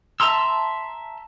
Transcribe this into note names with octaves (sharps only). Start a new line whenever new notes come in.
E5 A5 A#5 C6 E6